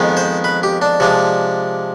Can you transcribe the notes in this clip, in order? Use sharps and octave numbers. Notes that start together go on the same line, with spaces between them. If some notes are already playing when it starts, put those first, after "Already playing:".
Already playing: F2 D#3 G#3 B3
C5
B4
G4
D4
C3 F3 G#3 D4